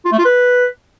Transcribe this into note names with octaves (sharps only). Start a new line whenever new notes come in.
F4
A3
F4
B4